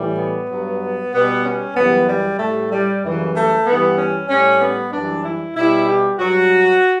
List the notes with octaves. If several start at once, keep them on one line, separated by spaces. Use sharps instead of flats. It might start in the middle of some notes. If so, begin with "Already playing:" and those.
Already playing: A2 E3 G3
B3
G2 F#3
B2 G3 B3
C#4
F#2 C#3 E3 G3 B3
G3
A2 G3 A3
G3
F#2 C#3 E3 G3
A3
G2 E3 G3 B3
C#4
A2 G3 C#4
B3
F#2 E3 G3 D4
E4
B2 G3 E4
G4
G2 F#3 F#4